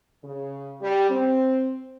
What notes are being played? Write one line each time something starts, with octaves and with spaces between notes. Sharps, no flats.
C#3
G3
C4